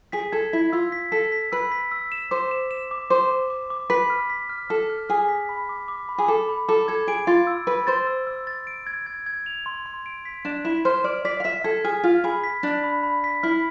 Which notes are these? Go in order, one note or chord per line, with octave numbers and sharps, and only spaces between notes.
G#4 B6
A4 G#6
E4 B6
F4 E6
B6
A4 B6
B6
B4 E6
B6
E6
E7
C5 D6
E7
E7
D6
C5 D6
D6
D6
D6
B4 B6
F6
B6
F6
A4 F6
F6
G#4 F6
B6
B5
D6
D6
B5
G#4
A4 D6
B5
A4 D6
A4 G#6
G#4 D7
F4 A6
E6
B4 E6
C5 A6
E6
E6
A6
D7
G#6
G#6
G#6
F7
C6
C6
D7
B6
D4 E7
E4 E7
C5 F6
D5 F6
D5 B6
F5
E5 B6
A4 G#6
G#4 F6
F4 F6
G#4 B5
B6
D4 B6
B5
B5
B6
E4 F6